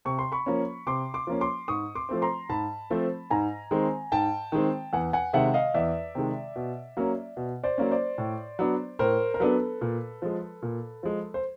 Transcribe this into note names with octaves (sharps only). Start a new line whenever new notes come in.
C3 C#6
C6
B5 C#6
F3 A#3 C#4
C3 C6 D6
C6 D6
F3 A#3 C#4
C6 D6
G#2 C#6 D#6
C6 D6
F3 A3 C4
A#5 C6
G#2 A5 B5
F3 A3 C4
G#2 G#5 A#5
D#3 G#3 C4
G#2 G5 A5
D#3 G#3 C4
E2 F#5 G#5
F#5 G#5
C3 D#3 G#3 E5 F#5
D#5 F5
E2 D5 E5
C3 D#3 G#3
B2
F#3 A#3 C#4
B2
C5 D5
F#3 A#3 C#4
C5 D5
A2
F#3 B3 D4
A2 A#4 C5
A#4
F#3 B3 D4 A4 B4
A#2
F3 G#3
A#2
F3 G#3
C5